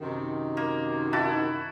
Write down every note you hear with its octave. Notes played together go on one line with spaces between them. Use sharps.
F#2 C3 D#3
A#3
E4 F#4 A5